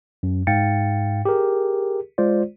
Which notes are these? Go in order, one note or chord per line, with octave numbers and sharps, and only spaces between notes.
F#2
G#2 F5 G5 A6 C#7
G4 G#4 A#4
G#3 F4 C5 D5